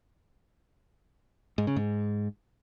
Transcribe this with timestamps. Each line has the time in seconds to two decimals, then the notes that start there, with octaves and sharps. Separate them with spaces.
1.58 G#2
1.67 C#3
1.76 G#2